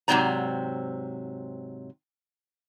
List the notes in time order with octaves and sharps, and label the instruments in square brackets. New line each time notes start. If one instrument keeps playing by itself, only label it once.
[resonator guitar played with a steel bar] G#2 C3 F#3 C4 D5 A#5